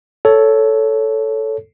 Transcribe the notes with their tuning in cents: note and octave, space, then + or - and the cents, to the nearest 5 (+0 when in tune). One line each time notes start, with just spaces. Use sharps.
A4 +0 C#5 +10